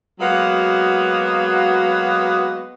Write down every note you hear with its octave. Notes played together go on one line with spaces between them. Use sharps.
F#3 G#3 A#3 B3 F#4